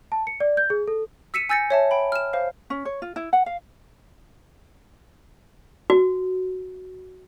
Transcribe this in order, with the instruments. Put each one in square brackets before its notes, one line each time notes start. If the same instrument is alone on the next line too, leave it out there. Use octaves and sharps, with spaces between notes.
[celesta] A5
C#7
D5
G6
G#4
A4
[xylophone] E6 B6 C#7 D#7 E7
G#5 E6 G6 A6 A#6 C#7
C#5 E5 A5
G5 B5
F6 E7
C5 F5
[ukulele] C#4
C#5
F4
E4
F#5
F5
[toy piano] F#4